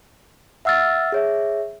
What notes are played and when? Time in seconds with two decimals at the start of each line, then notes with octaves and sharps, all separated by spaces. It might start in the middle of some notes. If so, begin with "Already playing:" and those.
0.65 E5 F#5 E6 F6 A6
1.12 G#4 C#5 E5